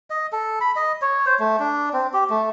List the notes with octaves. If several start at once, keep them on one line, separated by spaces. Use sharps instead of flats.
D#5
A4
B5
D#5
C#5
C5
A3
D4
C4
G4
A3